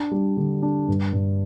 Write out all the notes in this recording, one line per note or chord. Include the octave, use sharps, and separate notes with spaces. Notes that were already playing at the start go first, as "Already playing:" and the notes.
Already playing: D4
G3
D3
D4
G2
G2